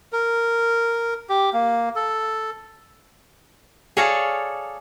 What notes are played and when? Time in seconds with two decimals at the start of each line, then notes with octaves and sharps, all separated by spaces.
0.12 A#4
1.29 G4
1.53 A#3
1.96 A4
3.97 G#4 A4 C#5 D5 F5 A#5